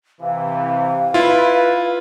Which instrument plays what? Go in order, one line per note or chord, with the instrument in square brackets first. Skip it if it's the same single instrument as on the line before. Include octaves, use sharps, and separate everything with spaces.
[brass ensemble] C3 E3 [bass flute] F5
[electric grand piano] E4 F4 [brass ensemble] B4